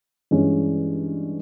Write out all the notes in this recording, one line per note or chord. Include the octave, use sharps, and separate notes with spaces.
G2 E3 G#3 C#4